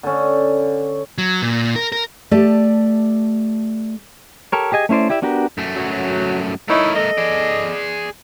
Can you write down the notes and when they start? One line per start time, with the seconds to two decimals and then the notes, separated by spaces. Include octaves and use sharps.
0.03 D3 C#4
1.18 F#3
1.42 A#2
1.76 A#4
1.92 A#4
2.31 A3 G4 D5 A5
4.52 G4 A4 A#4 C#5
4.72 G4 G#4 D#5 G#5
4.89 A3 C#4 E4 C5 D5
5.09 E4 G4 D5 E5
5.22 B3 D4 F#4 G4 A#4
5.58 F#2 A3
5.76 F#3
6.68 A3 D#4 E4 A#4 C#5
6.94 A4 D#5
7.18 G#4 D5